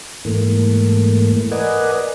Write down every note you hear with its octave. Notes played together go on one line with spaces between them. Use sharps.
G#2 E3 A3 A#3
A#4 B4 D5 D#5 F#5 G#5